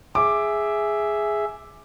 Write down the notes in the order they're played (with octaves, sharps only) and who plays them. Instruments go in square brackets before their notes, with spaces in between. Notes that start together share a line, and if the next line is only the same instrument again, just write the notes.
[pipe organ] G#4 E5 [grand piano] D6